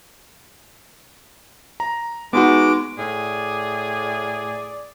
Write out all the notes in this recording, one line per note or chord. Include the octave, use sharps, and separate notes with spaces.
A#5
G#3 B3 D#4 F#4 D6
A2 G#4 D5